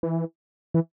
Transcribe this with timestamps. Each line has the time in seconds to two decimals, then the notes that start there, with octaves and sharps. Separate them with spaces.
0.03 E3
0.74 E3